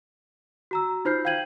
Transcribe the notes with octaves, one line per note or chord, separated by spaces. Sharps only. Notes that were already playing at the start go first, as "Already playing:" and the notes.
F#4 A#5 E6
D#4 F4 C5 F6 G6 C7
F5 G5 G6 G#6 D#7 F#7